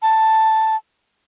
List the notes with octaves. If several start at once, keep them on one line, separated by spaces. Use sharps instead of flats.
A5